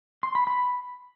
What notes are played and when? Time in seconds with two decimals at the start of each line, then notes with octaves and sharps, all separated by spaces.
0.23 C6
0.35 B5
0.47 B5